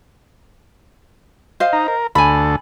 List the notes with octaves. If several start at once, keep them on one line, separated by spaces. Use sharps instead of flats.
C5 D#5 F5
D#4 A#5
A#4
D2 A4 G#5 B5